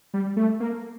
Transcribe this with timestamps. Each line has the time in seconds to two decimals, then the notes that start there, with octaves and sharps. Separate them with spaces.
0.14 G3
0.37 A3
0.60 A#3